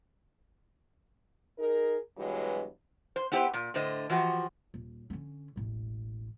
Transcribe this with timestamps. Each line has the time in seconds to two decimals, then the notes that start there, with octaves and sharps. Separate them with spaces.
1.58 D#4 G#4 A#4
2.17 G2 B2 E3 F#3 G#3
3.16 C5
3.32 B3 E4 G4 B4 C5
3.53 A#2
3.74 A2 D3 C5 D#5
4.10 E3 F3 F#4 G4
4.74 D#1
5.10 D3 C#4
5.56 E1 A1